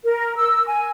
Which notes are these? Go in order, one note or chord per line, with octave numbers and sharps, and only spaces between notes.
A#4
E6
G#5